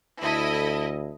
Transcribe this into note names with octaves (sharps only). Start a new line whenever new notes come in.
D2 E4 A4 D#5